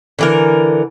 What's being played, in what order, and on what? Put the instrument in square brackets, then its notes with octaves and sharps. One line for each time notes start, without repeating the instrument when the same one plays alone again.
[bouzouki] D3 E3 A#4